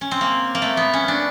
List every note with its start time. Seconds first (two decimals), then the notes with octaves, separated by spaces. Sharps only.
0.01 C#4
0.11 C4
0.21 A#3
0.55 A#3
0.62 A3
0.77 B3
0.93 C#4
1.08 D4